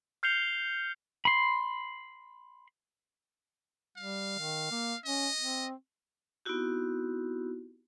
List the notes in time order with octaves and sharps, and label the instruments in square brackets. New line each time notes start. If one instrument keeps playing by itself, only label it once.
[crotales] F6 G6 C7 C#7 F7 G7
[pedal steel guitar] B5 C6
[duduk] G3 [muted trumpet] F5
[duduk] D#3
A#3
[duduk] C#4 [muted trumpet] D#5
[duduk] C4
[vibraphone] B3 C4 D#4 E4 F#4 G4